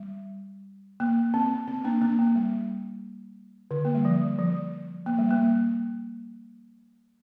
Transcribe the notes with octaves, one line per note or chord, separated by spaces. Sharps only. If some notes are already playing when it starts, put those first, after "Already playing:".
Already playing: G3
A#3
C4
C4
A#3 D4
A#3 D4
A#3
G3
D3
A#3
G3
F3
F3
A#3
G3
A#3